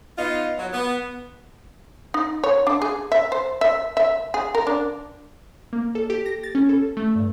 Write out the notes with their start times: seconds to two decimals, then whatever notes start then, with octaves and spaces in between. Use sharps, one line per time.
0.18 B3 D#4 F4
0.58 F#3
0.73 B3
2.14 D#4
2.44 C#5
2.67 D4
2.82 G#4
3.12 E5
3.32 C5
3.61 E5
3.97 E5
4.34 G#4
4.55 A#4
4.67 D4
5.73 A#3
5.95 A4
6.10 G4
6.26 A#6
6.43 A6
6.55 C#4
6.69 A4
6.97 A3
7.16 G2